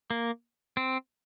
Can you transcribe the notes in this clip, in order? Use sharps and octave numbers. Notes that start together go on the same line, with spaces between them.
A#3
C4